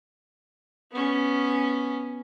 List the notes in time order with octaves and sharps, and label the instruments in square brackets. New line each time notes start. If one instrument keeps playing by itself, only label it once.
[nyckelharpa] B3 C#4